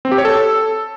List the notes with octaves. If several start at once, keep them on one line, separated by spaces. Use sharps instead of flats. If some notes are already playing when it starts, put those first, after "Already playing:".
C4
G4
C#5
A4